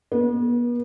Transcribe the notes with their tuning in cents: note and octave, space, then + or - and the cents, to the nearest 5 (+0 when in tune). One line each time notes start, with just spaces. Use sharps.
B3 -40